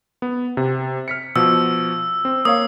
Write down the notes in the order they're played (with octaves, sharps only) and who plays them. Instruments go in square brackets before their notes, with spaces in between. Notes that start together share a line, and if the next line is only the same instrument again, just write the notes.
[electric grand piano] B3
C3
F6 B6 C#7
[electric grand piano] B2 F3 [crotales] E6
[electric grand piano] C4
[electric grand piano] A#3 C#5 F5 [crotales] D#6